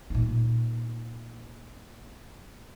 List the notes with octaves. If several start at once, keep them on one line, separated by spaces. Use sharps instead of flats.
A#2 D#4